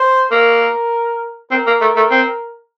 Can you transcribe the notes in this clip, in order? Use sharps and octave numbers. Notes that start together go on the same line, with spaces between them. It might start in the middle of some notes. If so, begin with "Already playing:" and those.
Already playing: C5
A#3 A#4
C4 A#4
A#3
A3
A3
C4